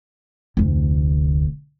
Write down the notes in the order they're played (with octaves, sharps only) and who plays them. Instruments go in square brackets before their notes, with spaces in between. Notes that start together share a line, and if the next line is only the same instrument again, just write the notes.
[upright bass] F1 D2